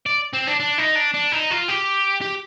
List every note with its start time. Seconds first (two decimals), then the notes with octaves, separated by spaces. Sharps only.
0.06 D5
0.33 C4
0.47 D4
0.60 D4
0.78 D#4
0.95 D4
1.14 D4
1.32 D#4
1.51 F4
1.68 G4
2.22 G4